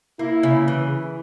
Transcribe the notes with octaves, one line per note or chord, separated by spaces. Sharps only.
A#3 E4
C#3
E3